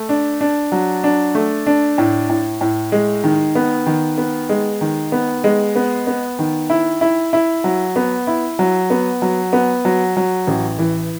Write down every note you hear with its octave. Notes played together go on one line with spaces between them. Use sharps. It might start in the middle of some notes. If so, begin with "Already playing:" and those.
Already playing: A3
D4
D4
F#3
D4
A3
D4
A2
A2
A2
G#3
D#3
B3
D#3
B3
G#3
D#3
B3
G#3
B3
B3
D#3
E4
E4
E4
F#3
B3
E4
F#3
B3
F#3
B3
F#3
F#3
A1
E3